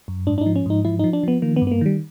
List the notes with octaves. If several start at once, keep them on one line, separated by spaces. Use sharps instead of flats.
F#2
G#2 D4
D4
F3 D#4
C#4
G#2 D#4
F3 E4
F3 D#4
D4
F3 B3
D#3 A#3
B3
G2
B3
A#3
D#3 G3